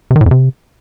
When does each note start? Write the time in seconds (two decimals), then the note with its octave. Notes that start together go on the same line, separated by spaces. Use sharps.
0.11 C3
0.16 D#3
0.21 A2
0.26 F2
0.31 C3